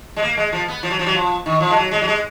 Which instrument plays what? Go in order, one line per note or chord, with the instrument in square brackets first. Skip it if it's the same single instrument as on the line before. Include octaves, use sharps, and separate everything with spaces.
[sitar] G#3
A#3
G#3
F3
B3
F3
F#3
F3
F#3
F3
D#3
F3
G#3
F#3
G#3
F#3
G#3